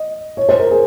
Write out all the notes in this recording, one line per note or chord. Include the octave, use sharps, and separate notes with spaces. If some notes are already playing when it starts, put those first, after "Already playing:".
Already playing: D#5
C#5
C5
A#4
G#4